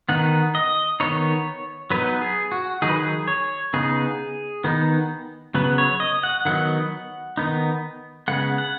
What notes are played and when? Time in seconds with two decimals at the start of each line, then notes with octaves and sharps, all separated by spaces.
0.09 D#3 B3 D#4 F#5
0.55 D#5
1.00 D#3 B3 D#4 C#5
1.90 F#3 B3 D#4 B4
2.21 G#4
2.52 F#4
2.82 D#3 F#3 D#4 G#4
2.89 B4
2.96 G#4
3.28 C#5
3.73 C#3 B3 D#4 G#4
4.64 D#3 B3 D#4
5.54 C#3 F#3 B3 B4
5.78 C#5
6.00 D#5
6.23 F#5
6.45 D#3 F#3 B3 D#4 F#5
7.37 D#3 B3 D#4
8.28 C#3 G#3 B3 F#5
8.58 F#5